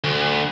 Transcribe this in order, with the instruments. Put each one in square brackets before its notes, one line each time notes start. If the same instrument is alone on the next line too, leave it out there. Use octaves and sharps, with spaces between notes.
[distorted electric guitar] D2